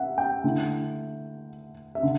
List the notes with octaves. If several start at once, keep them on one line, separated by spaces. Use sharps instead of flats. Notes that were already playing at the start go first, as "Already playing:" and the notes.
Already playing: E5 F#5
G5
D3 A3 E4
E5
D3